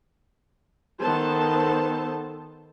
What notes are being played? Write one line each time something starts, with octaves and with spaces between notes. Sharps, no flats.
D#3 B3 A4 C5 A5